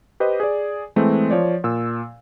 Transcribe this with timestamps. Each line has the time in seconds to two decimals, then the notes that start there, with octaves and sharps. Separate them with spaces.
0.20 G4 B4 C5 D#5
0.40 G#4 D5
0.96 E3 G#3 A3 C4
1.31 F3 C#5 D5
1.64 A#2 E6